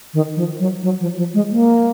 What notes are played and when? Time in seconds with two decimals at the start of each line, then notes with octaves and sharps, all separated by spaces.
0.14 D#3
0.36 F3
0.59 F#3
0.83 F#3
1.01 F3
1.17 F3
1.34 G#3
1.51 A#3